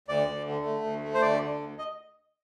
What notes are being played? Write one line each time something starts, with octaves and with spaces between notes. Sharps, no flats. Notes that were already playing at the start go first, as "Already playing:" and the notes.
D2 D5
D2
D3
A3
D2
A3
C5
D2 D5
D3
D2
D#5